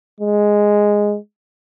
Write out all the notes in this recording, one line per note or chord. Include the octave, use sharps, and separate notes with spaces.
G#3